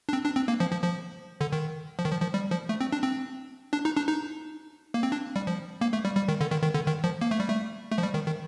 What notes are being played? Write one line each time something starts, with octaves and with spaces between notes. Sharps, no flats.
D4
C4
D4
C4
A#3
F3
F3
F3
D3
D#3
F3
D#3
F3
F3
G3
F3
A3
C4
D4
C4
D4
D#4
D4
D#4
A#3
C4
D4
G3
F3
A#3
A3
G3
G3
D#3
D3
D#3
D#3
D3
D#3
F3
A#3
A3
G3
A3
A3
F3
G3
D#3
D#3